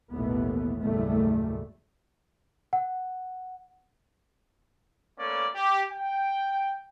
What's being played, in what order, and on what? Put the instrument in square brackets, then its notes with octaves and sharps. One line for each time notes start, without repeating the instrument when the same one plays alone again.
[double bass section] A1 D#2 B2 E3 A3 B3
F#1 D#2 A2 G3 A3
[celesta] F#5
[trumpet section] A3 A#3 C#4 B4 D5
G4
G5